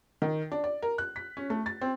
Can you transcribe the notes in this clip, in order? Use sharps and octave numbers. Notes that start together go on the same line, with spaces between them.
D#3
D4
D5
A#4
F#6
B6
C#4
A3
A6
C4